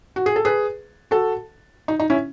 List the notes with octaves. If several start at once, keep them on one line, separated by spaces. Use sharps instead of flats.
F#4
G#4
A4
G#4 B4
F#4 A4
D#4
D#4
C#4 E4